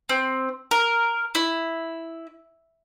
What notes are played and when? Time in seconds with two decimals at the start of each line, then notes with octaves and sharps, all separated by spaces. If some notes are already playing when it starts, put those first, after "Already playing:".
0.09 C4
0.71 A#4
1.35 E4